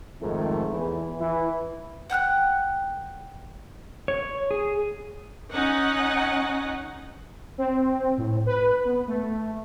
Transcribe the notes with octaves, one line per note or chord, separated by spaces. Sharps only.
F2 G#2 D#3 A3
E2 E3
E3 E4
F#5 G5 F6 F#6
C#5
G#4
C#4 D#4 F#5
C4
A2
B4
B3
A3